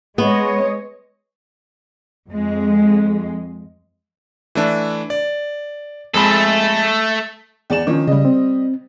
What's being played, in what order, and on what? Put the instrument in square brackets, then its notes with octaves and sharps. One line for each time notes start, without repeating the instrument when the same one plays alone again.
[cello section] G#3 C#5 D#5 [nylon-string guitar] B3
[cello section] F2 G#3
[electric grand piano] E3 A3 D4
D5
[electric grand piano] F2 G#3 B5 [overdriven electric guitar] A3 A4
[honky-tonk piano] E2 D5 E7
[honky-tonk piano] D#3 F3 C#4 [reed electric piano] D6
[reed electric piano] C#3 [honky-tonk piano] G3 D#5
[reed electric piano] C4